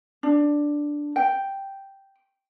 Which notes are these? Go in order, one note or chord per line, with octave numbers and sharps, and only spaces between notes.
D4
G5